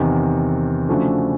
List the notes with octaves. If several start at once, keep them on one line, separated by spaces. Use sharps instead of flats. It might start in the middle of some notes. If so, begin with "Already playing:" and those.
Already playing: E2 C3 D#3
C#3 F3 A3 D4 F#4